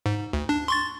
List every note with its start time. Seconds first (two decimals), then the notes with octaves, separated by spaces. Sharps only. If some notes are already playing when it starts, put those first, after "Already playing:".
0.06 G#2
0.33 D2
0.49 D4
0.68 C6 C#6 A6